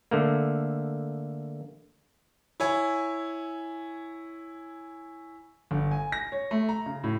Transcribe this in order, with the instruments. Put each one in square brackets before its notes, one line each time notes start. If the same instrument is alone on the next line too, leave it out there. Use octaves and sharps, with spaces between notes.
[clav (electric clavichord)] D3 A3 A#3
[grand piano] E4 C#5 G#5
G1
G#5
A#6
C#5
A3
A#5
C#3
A2